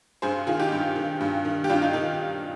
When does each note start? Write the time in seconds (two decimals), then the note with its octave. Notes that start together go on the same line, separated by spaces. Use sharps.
0.22 G2 G#4 C5
0.47 D#3 F4 G#4
0.60 D#4 G4
0.72 G2
0.96 D#3
1.21 G2
1.45 D#3
1.64 G4
1.69 G2 D4 F4
1.82 D#4
1.93 D#3 D#4